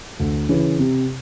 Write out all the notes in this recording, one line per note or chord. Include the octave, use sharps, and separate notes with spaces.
D2
C#3 E3
C3